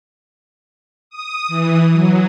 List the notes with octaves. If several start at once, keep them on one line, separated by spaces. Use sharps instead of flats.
D#6
E3
F#3